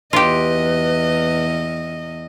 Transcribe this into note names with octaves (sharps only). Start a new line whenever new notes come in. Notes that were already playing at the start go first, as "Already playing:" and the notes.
E2 F4 G4 B4 D#5